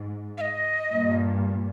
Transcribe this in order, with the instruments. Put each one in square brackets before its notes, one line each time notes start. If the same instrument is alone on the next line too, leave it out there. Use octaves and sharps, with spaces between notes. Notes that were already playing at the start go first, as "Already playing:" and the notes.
Already playing: [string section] G#2
[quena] F5
D#5
[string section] G2 A#2